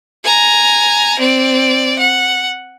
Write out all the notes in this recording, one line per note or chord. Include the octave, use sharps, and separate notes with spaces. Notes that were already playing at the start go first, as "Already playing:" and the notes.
G#5 A#5
C4 D5
F#5